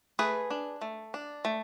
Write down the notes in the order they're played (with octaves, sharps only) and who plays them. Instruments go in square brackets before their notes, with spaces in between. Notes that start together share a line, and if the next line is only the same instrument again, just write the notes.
[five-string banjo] A3 G#4 B4
D4
A3
D4
A3